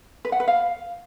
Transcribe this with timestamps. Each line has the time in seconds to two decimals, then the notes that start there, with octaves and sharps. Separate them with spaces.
0.25 B4
0.32 F#5
0.40 B4
0.48 F5